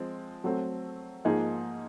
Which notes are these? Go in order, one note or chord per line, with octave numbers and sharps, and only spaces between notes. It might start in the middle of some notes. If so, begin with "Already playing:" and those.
Already playing: F3 G#3 C4
F#3 A3 C4
G#2 F3 A#3 D#4 G#4